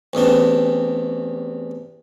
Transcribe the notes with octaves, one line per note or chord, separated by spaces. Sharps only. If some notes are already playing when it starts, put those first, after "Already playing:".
A1 E2 C3 D4